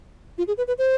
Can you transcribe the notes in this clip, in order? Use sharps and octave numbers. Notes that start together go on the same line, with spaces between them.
F4
G#4
B4
B4
C5